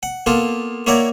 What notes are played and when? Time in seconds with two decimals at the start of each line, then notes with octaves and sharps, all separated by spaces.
0.03 F#5
0.26 A#3 B3 F4 A4
0.87 A#3 E4 C#5 D5 F#5 A#5